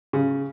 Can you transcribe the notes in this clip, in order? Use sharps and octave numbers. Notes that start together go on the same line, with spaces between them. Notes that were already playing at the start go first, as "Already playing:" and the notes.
C#3